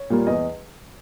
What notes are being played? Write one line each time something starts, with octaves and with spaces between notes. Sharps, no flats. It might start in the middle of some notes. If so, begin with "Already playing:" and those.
Already playing: C#5
A#2 G3 A#3
E2 D#5